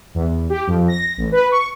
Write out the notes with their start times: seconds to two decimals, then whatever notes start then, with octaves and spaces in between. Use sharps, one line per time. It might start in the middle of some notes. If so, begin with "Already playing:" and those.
0.14 E2
0.50 G4
0.67 F2
0.88 A#6
1.17 A1
1.32 B4
1.52 C#6